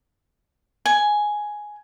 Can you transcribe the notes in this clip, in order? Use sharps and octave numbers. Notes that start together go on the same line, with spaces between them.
G#5